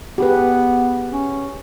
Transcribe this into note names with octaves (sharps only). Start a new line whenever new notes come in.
B3 G4 G#4 B4
C#4